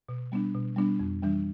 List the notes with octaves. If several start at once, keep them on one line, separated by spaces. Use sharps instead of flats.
B2
G3 B3 D4
B2
G3 B3 D4
F2
E3 G3 D4